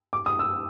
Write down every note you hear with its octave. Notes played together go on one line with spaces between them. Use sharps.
D6
D#6
E6